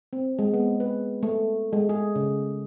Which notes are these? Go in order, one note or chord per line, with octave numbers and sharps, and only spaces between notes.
C4
G#3
B3
B4
A3
G#3
G#4
C#3